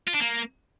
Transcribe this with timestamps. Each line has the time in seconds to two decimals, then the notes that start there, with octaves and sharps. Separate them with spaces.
0.07 F4
0.14 D4
0.20 A#3